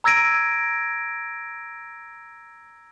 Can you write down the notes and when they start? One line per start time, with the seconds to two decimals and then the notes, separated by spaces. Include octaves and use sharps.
0.04 A#5 E6 G#6 A#6 D7 D#7